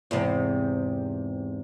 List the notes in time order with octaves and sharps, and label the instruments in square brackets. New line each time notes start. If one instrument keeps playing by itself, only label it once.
[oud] E2 G#2 C3